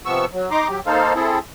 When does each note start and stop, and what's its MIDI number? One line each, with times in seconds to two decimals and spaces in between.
0.06 0.25 48
0.06 0.25 53
0.06 0.25 59
0.06 0.25 85
0.06 0.25 88
0.33 0.50 54
0.51 0.68 63
0.51 0.68 82
0.51 0.68 84
0.51 0.68 86
0.68 0.80 54
0.68 0.80 67
0.86 1.13 58
0.86 1.13 63
0.86 1.13 69
0.86 1.13 72
0.86 1.13 77
1.15 1.39 60
1.15 1.39 64
1.15 1.39 68
1.15 1.39 69